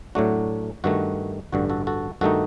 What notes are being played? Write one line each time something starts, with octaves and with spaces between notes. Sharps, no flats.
A2 F#3 A3 D4 F#4
G2 D#3 A3 F#4
A1 G2 D3 F#4
F#4 A4
F#4 A4
G2 D#3 A3 D#4 F#4 A4